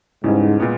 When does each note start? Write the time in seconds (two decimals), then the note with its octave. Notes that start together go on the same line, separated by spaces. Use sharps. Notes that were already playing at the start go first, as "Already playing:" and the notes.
0.24 E2 G#2 C#3 E3 G3
0.60 A#2 G#3 B3